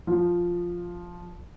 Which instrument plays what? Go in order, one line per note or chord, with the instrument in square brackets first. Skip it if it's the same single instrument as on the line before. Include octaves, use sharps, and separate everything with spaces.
[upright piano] F3